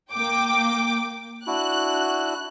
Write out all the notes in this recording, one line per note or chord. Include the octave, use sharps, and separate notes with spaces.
A#3 G5 D6
D4 E4 F#4 F#6